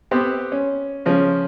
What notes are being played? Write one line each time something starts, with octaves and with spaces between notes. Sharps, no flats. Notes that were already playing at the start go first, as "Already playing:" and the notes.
B3 C4 G4
C#4
C#3 F3 C#4